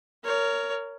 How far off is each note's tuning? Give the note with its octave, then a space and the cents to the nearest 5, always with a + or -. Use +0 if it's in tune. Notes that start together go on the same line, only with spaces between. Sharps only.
A#4 -10 C#5 +20